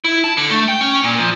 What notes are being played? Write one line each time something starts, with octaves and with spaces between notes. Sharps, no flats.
E4
A5
D3
A3
G5
C#4
A#2
F3